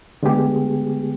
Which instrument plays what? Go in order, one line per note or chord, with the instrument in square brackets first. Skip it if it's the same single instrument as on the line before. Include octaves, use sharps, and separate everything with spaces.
[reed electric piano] D3 G#3 A3 B3 G4 G#4